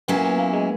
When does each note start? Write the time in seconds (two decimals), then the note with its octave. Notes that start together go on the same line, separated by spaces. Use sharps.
0.08 A#2 F#3 B3 C#4 E4
0.16 A#3
0.24 B3
0.38 A#3
0.53 G#3